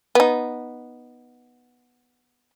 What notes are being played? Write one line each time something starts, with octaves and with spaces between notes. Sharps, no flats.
B3 D#4